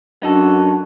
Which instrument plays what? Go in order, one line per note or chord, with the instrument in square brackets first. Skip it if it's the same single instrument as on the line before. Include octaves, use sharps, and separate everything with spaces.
[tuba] F#2 [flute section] D4 F#4 [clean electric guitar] D#4 A4